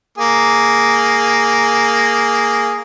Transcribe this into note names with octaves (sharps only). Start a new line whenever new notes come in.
A#3 G#4